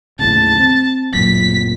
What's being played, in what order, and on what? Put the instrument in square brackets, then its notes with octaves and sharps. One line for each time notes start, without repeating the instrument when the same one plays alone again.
[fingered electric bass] D#2 A2 C#3 [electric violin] A5
[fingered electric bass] C4
[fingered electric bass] D1 F#2 A#2 [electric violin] B6